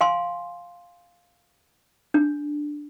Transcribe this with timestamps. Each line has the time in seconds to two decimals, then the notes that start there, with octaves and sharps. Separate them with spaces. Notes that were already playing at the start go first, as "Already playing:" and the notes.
0.01 F5 G#5 C6
2.14 D4